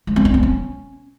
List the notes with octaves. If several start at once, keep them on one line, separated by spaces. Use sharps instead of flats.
G#3
C4
D4
C4
C#4